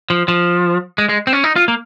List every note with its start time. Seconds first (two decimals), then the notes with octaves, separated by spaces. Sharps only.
0.10 F3
0.28 F3
0.98 G#3
1.09 G#3
1.27 C4
1.33 C#4
1.44 D#4
1.56 F4
1.68 A#3